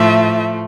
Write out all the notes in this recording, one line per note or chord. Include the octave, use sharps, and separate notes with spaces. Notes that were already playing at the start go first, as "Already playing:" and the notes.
Already playing: A2 F3 A3 E5